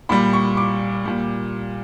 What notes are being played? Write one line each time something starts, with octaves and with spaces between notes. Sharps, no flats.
A#2 G3 B5
C#6
D6
A#2 G3